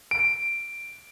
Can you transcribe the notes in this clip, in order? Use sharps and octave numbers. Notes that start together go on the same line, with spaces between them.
D7